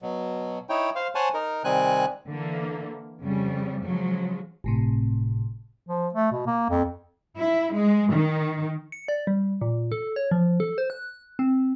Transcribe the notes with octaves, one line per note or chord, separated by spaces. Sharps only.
B2 F#3
D#4 E4 C#5 G5
C5 F5
C5 C#5 F#5 G#5 A5
D#4 A#4
C3 D#3 G3 C4 G#5 F#6
D3 E3 A#3
F2 C#3 G3
C#3 F3 F#3 G#3
G1 A2 C3
F3
A3
B2
A#3
F2
E4
G#3
D#3
C#7
D5
G3
A#2
A4
C#5
F3
A4
C5
F#6
C4